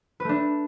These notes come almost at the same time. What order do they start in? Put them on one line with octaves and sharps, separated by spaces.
B4 A3 D4